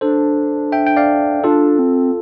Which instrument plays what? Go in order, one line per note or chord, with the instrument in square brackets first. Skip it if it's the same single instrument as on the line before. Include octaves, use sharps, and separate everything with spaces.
[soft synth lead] D4 [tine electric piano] A4 C5
[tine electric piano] E5 G5
G5
D5 F5
[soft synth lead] D4 [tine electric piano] F4 A4
[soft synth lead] C4